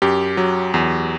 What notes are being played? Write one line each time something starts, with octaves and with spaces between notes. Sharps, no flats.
F#2 G4
F#3
E2